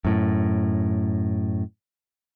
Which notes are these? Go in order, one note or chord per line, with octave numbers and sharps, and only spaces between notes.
F#2 A2